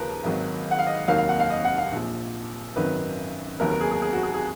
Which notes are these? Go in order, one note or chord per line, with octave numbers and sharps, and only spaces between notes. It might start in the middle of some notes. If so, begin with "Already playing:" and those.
Already playing: D#2 C#3 F3 A#3 A#4 B4
G#1 G#2 D#3 F#3
F#5
F5
D#5
F1 D#2 D#3 F#3 A#3 F5
F5
F#5
F5
D#5
F#5
F5
A#1 A#2 F3
G#1 F#2 D#3 F#3 B4
F1 D#2 D#3 F#3 B3 A#4
A#4
G#4
G#4
G#4
F#4
G#4
G#4